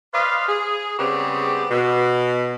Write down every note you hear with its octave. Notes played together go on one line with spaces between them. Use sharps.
B4 C5 D5 D#5 F5
G#4
C#3 G3 B3 C4 G4 G#4
B2